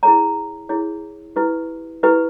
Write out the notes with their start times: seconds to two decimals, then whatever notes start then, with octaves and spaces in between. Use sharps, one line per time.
0.03 E4 G#4 C#5 A#5
0.69 E4 G#4 C#5
1.36 E4 G4 B4
2.03 E4 G4 B4